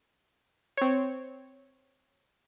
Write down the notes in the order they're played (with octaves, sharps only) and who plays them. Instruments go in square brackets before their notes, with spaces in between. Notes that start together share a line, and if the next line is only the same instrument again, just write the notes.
[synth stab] C4 C#5